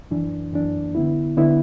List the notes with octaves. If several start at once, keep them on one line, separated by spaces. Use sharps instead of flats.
F#2 E3 D4
F#2 E3 D4
D3 B3 E4
D3 B3 E4